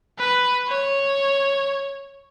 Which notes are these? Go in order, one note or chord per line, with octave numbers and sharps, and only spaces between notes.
B4
C#5